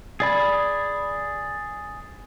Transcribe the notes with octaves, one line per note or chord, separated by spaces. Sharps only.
G#4 D5 B5